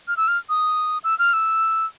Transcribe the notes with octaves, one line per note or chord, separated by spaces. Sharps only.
F6
E6
F6
D#6
E6
F6
E6